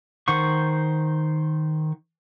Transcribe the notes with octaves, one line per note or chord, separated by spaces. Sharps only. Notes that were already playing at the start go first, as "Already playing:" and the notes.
D#3 C5 F#5 C#6